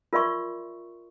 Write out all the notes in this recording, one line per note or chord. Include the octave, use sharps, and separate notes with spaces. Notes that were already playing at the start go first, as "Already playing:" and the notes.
F4 A#4 D5 E5 C6 C#6